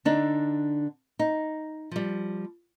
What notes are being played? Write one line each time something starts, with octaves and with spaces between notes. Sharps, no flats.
D3 D4 D#4
D#4
F3 G3